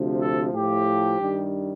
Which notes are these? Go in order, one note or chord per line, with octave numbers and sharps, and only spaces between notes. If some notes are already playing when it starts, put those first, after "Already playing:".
Already playing: D2 C3 F3
A4
A2 F3 G4
G2 D#3 G3